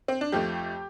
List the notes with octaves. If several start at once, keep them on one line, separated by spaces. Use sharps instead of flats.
C4
D4
F2 F3 A3 G4